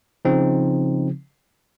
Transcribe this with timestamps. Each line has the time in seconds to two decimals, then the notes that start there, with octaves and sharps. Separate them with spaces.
0.25 C#3 F3 C4 D#4